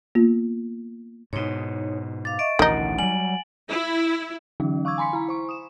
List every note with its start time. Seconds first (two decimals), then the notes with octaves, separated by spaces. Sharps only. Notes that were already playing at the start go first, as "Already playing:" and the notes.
0.15 A#3 B3 F4
1.33 G#2 B2 D#4 C#5
2.25 F5 D6 A6
2.39 D#5 E5 C#6 D7
2.59 A1 D2 B2 D#3 D#4 F#5
2.99 F#3 G3 G#5 F#7
3.70 E4
4.60 D3 E3 F#3 C#4 D#4
4.85 F5 C#6 D6 E6 G#6
4.98 G#5 B5 C6 B6 C#7
5.13 E4 A#5
5.29 C5 C#6
5.49 D#6 E7